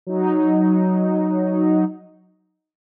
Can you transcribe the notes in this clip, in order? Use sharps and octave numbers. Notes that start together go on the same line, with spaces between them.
F#3 D#4